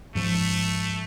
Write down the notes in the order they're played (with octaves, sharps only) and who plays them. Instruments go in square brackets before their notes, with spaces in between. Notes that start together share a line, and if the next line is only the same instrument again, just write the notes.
[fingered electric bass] G#2 F3 [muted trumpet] A3